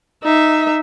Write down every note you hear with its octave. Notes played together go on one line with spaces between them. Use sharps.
D#4 E5